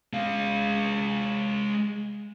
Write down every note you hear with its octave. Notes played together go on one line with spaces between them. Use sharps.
G#3 F5